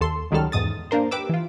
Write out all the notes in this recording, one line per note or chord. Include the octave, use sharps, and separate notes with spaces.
D#2 A4 C6
C#2 D#3 F#3 G3 A4 F6
E2 G#2 D#6 A6
A#3 D4 A#4 C5
G4 B4 D6 E6
E3 F4